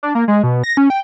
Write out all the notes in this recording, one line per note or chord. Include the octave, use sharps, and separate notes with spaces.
D4
A#3
G#3
B2
A#6
C#4
G5